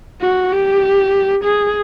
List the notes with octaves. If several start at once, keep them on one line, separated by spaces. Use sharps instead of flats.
F#4
G4
G#4